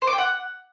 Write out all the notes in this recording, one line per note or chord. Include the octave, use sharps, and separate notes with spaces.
C5
D6
G5
F#5